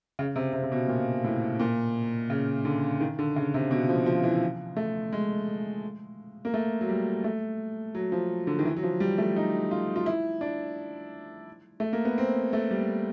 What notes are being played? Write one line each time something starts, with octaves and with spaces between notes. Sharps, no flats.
C#3
C3
C3
C3
B2
A#2
A2
A#2
C#3
D3
D#3
D3
C#3
C3
B2
F3
F3
E3
A3
G#3
A#3
A3
F#3
G3
A3
F#3
F3
D3
D#3
E3
F#3
F3
G3
A3
D#4
F4
F4
E4
D4
A3
A#3
B3
C4
A3
G3